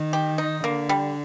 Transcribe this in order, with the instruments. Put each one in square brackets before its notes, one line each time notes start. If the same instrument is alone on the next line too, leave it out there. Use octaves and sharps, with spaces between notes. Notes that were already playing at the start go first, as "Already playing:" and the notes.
Already playing: [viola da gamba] D#3
[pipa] G4
D#4
[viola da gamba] D3 [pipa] A#3
[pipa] G3